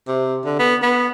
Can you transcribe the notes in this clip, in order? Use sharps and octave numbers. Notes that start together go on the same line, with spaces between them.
C3
D3
B3
B3